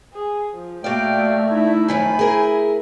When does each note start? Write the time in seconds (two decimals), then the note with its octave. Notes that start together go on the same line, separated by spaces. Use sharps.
0.13 G#4
0.54 F3
0.84 A#2 A3 F#4 D5 F5 G5
1.49 D#4 E4
1.88 F#2 D#3 F3 C5 G#5 B5
2.19 E4 G#4 A#4